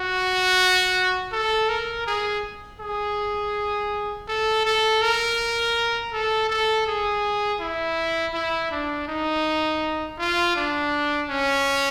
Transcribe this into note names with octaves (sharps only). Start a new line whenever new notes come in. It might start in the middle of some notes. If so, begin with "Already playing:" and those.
Already playing: F#4
A4
A#4
G#4
G#4
A4
A4
A#4
A4
A4
G#4
E4
E4
D4
D#4
F4
D4
C#4